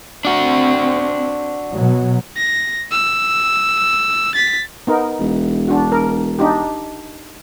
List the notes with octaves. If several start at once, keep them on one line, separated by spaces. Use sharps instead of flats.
C4 D4 F#4
B2 F#3
A#6
E6
A6 B6
B3 D#4 A#4
E1
D4 F#4
A#4
D4 D#4 G4